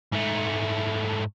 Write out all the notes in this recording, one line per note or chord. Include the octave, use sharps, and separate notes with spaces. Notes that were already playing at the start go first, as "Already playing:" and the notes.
G#2 A3